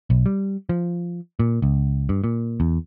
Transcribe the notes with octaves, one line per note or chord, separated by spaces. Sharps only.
B1
G3
F3
A#2
C#2
G2
A#2
E2